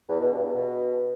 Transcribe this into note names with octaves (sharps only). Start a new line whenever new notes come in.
E2
B2
G2
E2
B2